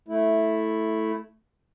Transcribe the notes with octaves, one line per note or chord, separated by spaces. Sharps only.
A3 E4